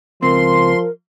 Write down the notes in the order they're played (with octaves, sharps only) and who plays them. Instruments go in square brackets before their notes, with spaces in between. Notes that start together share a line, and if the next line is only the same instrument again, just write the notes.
[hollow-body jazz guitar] C#2 C4 [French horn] F3 [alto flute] A#4 [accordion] C6